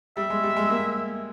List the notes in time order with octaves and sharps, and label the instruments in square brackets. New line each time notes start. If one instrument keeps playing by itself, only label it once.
[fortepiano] G3 [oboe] E5
[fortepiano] G#3
G3
G#3
A#3